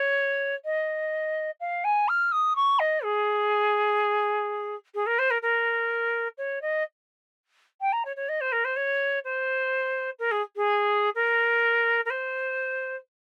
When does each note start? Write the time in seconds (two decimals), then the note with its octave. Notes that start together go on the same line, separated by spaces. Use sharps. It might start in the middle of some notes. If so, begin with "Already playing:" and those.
Already playing: C#5
0.65 D#5
1.60 F5
1.84 G#5
2.08 F6
2.32 D#6
2.56 C#6
2.79 D#5
3.04 G#4
4.94 G#4
5.06 A#4
5.19 C5
5.30 A#4
5.42 A#4
6.38 C#5
6.62 D#5
7.81 G5
7.92 A#5
8.05 C#5
8.16 C#5
8.29 D#5
8.41 C5
8.52 A#4
8.64 C5
8.76 C#5
9.24 C5
10.19 A#4
10.31 G#4
10.56 G#4
11.15 A#4
12.05 A#4
12.10 C5